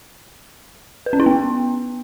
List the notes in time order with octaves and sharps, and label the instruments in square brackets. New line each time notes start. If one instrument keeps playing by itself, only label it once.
[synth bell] B4
C#4
E4
B3